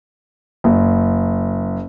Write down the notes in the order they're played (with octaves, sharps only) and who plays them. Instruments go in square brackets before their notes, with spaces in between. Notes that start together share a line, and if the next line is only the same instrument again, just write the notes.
[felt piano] F#1